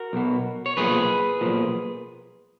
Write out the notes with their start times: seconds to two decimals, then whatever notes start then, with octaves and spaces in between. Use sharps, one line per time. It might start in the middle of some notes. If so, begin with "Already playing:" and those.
Already playing: F#4 A#4
0.13 B1 B2
0.66 C#5
0.77 B1 A#2 F3 G#4 B4
1.41 B1 A#2 F3